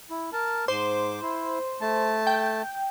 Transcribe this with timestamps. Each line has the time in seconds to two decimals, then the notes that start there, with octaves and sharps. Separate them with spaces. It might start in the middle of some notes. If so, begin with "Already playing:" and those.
0.10 E4
0.33 A#4 A5
0.68 G#2 C5 D6
1.22 E4
1.81 A3 A5
2.27 G5